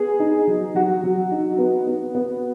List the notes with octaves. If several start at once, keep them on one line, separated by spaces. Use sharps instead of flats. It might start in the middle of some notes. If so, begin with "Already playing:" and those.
Already playing: B3 G#4
D#4
F#3
F#3 F#4
F#3
D#4
B3
B3
B3